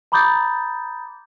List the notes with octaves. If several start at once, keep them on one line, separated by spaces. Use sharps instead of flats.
A#5 B5 D6 D#6 G6 A6